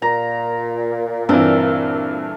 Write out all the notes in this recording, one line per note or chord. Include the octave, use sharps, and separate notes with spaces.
A#2 A#5
G2 E3 C4 A4 E5